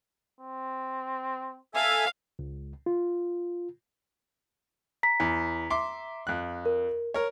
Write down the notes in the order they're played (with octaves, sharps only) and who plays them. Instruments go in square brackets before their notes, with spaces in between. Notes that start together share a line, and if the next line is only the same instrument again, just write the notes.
[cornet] C4
[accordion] A4 E5 G#5 [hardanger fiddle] F5
[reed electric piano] C#2
F4
[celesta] A#5 B6
[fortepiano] E2
E5 C6 D6
F2 F#6
[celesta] A#4
[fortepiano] A#4 C#5